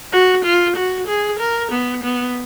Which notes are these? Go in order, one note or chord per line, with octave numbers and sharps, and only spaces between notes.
F#4
F4
F#4
G#4
A#4
B3
B3